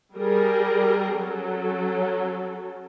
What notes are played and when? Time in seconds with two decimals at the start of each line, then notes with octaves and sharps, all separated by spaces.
0.16 G3 G#4 A#4
1.16 F#3 C#4 A4